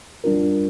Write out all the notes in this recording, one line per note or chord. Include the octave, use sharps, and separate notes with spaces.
G3 D4 F4 A#4